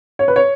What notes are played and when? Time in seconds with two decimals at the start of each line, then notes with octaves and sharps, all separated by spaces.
0.19 C#5
0.28 B4
0.36 C#5